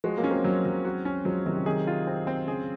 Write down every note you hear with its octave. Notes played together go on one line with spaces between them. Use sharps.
F3 G#3 F#4
F#3 A#3
C#4
G#3 C4
F#3
F#3
F#4
C#4
F3 F#3 G#3
C3 D#3 F#3
C#3
C3 D#3 G#4
F4
C4
C4
C#3 G#4